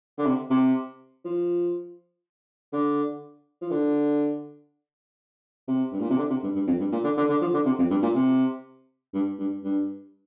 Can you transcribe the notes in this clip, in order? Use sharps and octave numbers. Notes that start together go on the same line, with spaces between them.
D3
C3
C3
F3
D3
F3
D3
C3
G2
A#2
C3
D3
C3
G2
G2
F2
G2
A#2
D3
D3
D3
F3
D3
C3
F2
G2
A#2
C3
G2
G2
G2